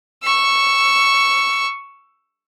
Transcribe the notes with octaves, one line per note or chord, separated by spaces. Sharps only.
C#6 E6